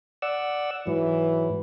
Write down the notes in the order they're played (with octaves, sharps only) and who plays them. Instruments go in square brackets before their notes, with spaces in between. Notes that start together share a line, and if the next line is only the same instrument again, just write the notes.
[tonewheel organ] D5 F#5 E6
[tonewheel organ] G#2 F#3 [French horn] E3